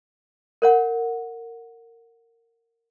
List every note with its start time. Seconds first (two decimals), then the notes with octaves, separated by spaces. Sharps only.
0.62 A#4 C#5 F#5